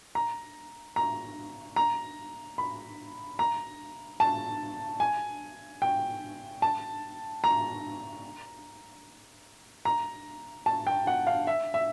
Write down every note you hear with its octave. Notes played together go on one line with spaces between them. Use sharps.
A#5
A#5
A#5
B5
A#5
A5
G#5
G5
A5
A#5
A#5
A5
G5
F#5
F5
E5
E5